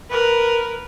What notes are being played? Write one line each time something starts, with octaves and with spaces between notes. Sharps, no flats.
A#4 B4